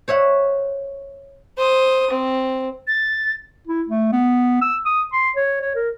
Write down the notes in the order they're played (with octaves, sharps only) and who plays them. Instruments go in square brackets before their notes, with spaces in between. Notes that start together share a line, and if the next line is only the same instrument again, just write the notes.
[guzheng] C5 C#5 E5 F#5
[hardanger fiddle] C5 D#6
C4
[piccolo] A6
[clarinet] E4
A3
B3
E6
D#6
C6
C#5
C#5
A#4